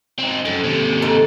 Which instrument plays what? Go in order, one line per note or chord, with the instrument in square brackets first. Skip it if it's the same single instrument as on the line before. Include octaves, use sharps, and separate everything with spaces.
[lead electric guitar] C4 D#4
[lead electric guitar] F#2 [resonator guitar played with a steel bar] A4
[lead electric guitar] D#2 C3
[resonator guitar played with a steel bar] G#2 A4